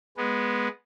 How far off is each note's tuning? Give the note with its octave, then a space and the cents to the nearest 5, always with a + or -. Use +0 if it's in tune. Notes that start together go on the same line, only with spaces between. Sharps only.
G#3 +0 B3 -10